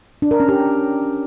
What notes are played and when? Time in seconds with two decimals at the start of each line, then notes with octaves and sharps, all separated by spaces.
0.22 D4
0.31 A#4
0.40 C#4
0.49 G4